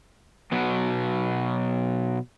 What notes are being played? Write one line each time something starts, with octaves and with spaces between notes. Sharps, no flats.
B2 F#3 B3